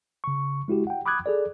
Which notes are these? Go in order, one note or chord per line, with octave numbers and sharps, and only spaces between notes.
C#3 C#6
G#3 E4 F#4 G4
F#5 G5
B5 D6 D#6 F#6 G#6
G#4 A4 D5